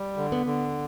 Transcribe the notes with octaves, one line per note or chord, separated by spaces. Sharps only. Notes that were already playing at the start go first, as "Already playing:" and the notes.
Already playing: G3
D3
B3
D3